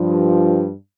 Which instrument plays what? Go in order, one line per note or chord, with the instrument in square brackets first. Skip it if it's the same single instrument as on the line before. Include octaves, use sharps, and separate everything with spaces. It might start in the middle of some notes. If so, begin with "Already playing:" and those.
Already playing: [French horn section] G2 F3